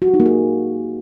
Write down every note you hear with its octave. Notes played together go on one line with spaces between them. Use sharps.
F#4
G4
D#4
A#3
G#4